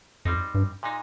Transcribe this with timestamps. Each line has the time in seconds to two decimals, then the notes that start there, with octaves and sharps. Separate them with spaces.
0.25 F2 G3 C4 D#4
0.54 G2
0.83 A#2 G#3 D#4